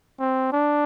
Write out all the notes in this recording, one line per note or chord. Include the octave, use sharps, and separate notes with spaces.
C4
D4